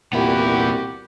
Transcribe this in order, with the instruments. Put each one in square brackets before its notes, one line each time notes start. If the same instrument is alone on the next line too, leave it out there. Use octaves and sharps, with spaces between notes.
[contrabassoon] C2 [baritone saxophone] A#2 [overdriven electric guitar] B3 E4 [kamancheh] F#4 G4